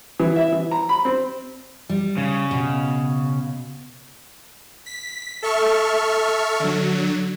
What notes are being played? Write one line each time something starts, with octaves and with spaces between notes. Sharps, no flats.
E3
E5
E3
A#5
B5
C4
G3
C#3
B2
B6
A4 E5 C#6 F6
D3 F#3